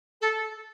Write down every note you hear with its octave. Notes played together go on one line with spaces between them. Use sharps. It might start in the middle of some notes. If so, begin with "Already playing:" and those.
A4